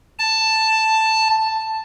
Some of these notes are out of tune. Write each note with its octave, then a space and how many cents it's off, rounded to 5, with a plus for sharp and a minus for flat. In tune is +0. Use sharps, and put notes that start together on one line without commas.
A5 +5